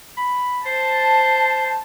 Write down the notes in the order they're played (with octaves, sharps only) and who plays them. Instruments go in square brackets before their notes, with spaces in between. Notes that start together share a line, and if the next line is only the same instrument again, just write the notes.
[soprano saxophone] B5
[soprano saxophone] C5 [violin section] A5